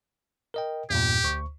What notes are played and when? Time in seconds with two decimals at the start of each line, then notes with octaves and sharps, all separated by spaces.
0.54 A#4 D#5 G5
0.90 E2 G2 A#2 G4
1.24 D2 C#6